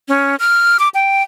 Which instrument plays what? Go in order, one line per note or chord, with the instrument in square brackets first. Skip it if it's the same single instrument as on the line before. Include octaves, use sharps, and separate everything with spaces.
[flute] C#4
F6
D6
G5